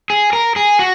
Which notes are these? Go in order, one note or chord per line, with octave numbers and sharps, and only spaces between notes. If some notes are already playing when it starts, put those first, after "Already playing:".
G#4
A#4
G#4
F#4